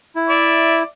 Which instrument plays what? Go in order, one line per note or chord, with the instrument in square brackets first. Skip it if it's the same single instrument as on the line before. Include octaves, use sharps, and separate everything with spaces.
[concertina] E4
[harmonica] D5 E5